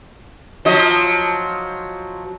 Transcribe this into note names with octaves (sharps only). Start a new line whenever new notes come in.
F3 F#3 D#5